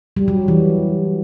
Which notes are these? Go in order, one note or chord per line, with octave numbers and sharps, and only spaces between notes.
G3
F#3
E3